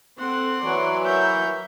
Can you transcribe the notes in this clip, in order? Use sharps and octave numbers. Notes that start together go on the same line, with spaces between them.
C4 A4 F#5 C6
E3 F#3 D5 C#6
A#4 E5 C#6 G6